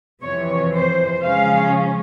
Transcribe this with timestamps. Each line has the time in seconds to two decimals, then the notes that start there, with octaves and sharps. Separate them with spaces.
0.22 F2 C3 E3 C#5
0.73 C5
1.24 C#3 F3 G#3 C#4 F5